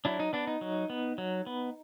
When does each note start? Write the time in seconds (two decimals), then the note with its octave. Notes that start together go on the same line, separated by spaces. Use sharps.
0.05 F#3 D4 E4
0.20 D#4
0.33 B3 D4
0.47 D#4
0.61 F#3
0.90 B3
1.18 F#3
1.46 B3